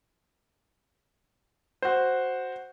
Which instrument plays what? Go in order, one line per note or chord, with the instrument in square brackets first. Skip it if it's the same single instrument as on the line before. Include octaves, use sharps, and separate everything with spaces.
[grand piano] F#4 C5